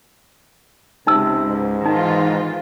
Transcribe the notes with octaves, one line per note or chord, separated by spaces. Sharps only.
C#2 C3 D#4 E6
G#2
D#3 E3 D#4 F4